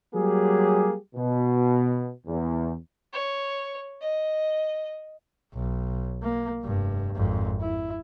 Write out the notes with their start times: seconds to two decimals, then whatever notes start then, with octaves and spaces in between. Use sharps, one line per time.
0.15 F#3 G3 A#3 G4 G#4
1.16 B2
2.27 E2
3.13 C#5
4.01 D#5
5.53 B1
6.23 A#3
6.63 F1 G2
7.16 G#1 F2
7.60 E4